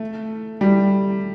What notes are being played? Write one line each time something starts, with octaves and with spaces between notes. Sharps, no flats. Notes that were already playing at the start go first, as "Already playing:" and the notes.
Already playing: A3
G3